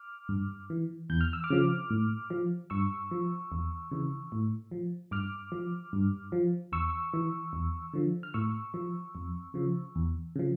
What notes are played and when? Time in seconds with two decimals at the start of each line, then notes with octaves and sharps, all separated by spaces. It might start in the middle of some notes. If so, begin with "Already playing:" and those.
Already playing: D6 F6
0.29 G2
0.70 E3
1.09 E2 G6
1.21 F6
1.33 E6
1.44 D6 F6
1.50 C#3 F3
1.90 A2
2.30 F3
2.70 G2 C#6 E6
3.11 F3
3.52 E2
3.91 C#3 E3
4.32 A2
4.71 F3
5.11 G2 D6 F6
5.52 F3
5.93 G2
6.32 F3
6.72 E2 C#6 E6
7.14 E3
7.53 E2
7.93 D3 F3
8.23 F6
8.34 A2 C#6 E6
8.74 F3
9.15 F2
9.54 C#3 F3
9.95 E2
10.36 C#3 F3